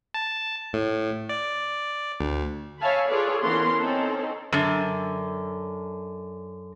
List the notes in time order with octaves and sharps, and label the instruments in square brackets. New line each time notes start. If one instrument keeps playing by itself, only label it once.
[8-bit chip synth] A5
A2
D5
D2
[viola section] C#5 E5 F5 G#5 A5 B5
F4 G#4 A4 B4 C#5 D5
D3 E3 B3 C#4 A#4 C6
C4 C#4 D#4 A4
[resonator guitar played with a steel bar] F#2 D3